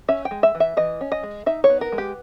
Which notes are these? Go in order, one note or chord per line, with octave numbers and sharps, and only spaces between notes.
C#4 E5
G5
G#3
E5
E3
E5
E3 D#5
C#4
D#5
G#3
D#4 E5
C#5
B3
A#4
G#3
G4